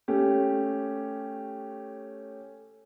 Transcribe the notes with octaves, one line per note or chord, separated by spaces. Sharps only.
A3 C#4 G4